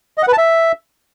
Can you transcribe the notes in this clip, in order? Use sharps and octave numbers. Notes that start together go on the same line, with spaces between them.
D#5
F#5
B4
A5
E5